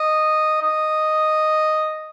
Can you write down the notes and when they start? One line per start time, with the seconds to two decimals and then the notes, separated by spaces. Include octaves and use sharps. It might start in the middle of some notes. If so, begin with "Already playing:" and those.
Already playing: D#5
0.62 D#5